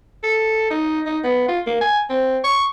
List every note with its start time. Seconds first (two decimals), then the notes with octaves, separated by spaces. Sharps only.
0.23 A4
0.71 D#4
1.06 D#4
1.24 B3
1.48 F4
1.66 A#3
1.81 G#5
2.10 C4
2.44 C#6